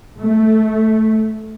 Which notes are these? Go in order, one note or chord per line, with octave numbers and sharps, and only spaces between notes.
A3